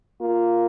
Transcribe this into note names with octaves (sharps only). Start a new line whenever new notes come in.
A#3 F4